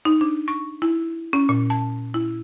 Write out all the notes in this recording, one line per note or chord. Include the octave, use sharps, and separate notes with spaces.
D#4
D4
C#6
E4
C#4
A#2
A5
E4